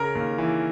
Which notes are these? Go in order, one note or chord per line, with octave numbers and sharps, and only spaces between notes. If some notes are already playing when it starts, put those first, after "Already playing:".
Already playing: C#3 A#4
D#2
E3